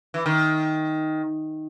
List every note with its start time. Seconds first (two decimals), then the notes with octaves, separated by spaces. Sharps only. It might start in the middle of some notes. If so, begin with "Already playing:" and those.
0.14 E3
0.26 D#3